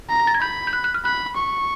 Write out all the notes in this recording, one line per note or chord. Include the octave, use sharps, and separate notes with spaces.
A#5
A#6
A6
G#6
B5 G6
G6
F#6
F#6
F6
B5 F#6
C#6